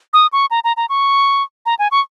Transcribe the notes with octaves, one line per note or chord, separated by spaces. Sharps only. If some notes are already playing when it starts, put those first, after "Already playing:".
D#6
C#6
A#5
A#5
A#5
C#6
A#5
G#5
C#6